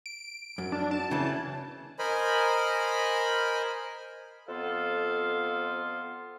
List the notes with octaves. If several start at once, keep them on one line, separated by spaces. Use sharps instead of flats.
D7
F#2
D4
A5
C#3 E3
A#4 C5 D#5 G#5 B5
F2 B3 A4 F5 C6